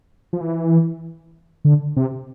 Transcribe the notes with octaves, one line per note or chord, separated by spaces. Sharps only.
F3
E3
D3
C3